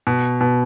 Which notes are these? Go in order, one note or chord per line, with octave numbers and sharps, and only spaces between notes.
B2
B2